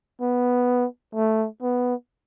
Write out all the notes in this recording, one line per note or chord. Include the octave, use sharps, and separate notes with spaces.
B3
A3
B3